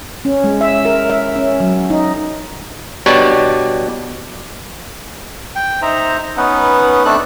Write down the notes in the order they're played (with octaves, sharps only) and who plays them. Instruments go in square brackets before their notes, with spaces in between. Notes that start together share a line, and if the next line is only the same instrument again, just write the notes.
[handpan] C#4
G#3
E5
A#4
E5
C#4
F#3
D#4
[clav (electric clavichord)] B2 G3 D4 G4 C#5 D5
[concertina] G5
D#4 C5 E5 A#5
B3 C#4 D#4 B4 F#5
A3 C4 D4 A4 F#6